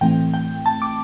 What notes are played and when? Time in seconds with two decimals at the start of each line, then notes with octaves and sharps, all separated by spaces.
0.01 A2 E3 A3 C4 G5
0.34 G5
0.66 A5
0.82 D6